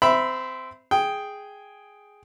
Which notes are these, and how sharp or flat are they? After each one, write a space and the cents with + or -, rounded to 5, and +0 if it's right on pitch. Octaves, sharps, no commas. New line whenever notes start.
C4 -20 E5 +0 B5 +0
G#4 +0 G5 +0